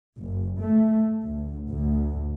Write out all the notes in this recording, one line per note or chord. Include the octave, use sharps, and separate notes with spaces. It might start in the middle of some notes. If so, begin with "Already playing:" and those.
F#1
A3
D2
D2